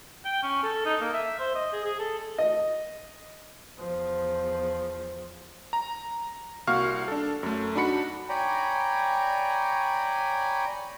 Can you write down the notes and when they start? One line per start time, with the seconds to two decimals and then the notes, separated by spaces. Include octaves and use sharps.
0.25 G5
0.43 C#4
0.63 A4
0.86 D#4
1.01 A#3
1.13 E5
1.39 C5
1.55 D#5
1.73 G#4
1.85 G#4
1.99 A4
2.38 D#5
3.79 E2 F3
5.73 A#5
6.67 C2 A#3 F#4 F5 C#6 F6
7.08 D4 A4
7.43 F#2 A3
7.76 D4 D#4 F#4 B5 C#7
8.29 C#5 D5 G5 G#5 A#5 B5